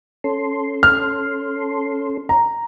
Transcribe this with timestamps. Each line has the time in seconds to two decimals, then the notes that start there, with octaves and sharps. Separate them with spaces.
0.24 C#4 A4 C6
0.83 F6
2.29 A#5